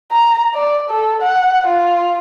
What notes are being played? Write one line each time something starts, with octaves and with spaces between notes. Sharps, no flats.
A#5
D5
A4
F#5
F4